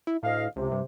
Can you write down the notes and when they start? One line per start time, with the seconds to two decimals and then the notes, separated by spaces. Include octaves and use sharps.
0.07 E4
0.23 D2 A2 D#5 F5
0.56 C#2 C3
0.72 G2